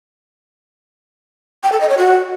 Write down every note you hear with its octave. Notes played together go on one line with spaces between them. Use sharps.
G5
A4
D#5
C#5
F#4